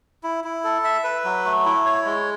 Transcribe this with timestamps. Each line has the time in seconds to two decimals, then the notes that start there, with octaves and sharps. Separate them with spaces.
0.23 E4
0.44 E4
0.64 A4
0.84 E5
1.04 B4
1.24 F#3
1.45 A3
1.65 E4
1.85 C#5
2.05 G#3